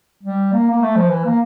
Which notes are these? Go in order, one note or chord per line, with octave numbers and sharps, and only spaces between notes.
G3
A#3
A#3
A3
F3
E3
A#3